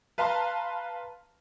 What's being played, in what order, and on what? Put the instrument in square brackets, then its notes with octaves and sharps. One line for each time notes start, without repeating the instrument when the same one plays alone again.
[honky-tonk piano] B4 F5 A5 A#5 C6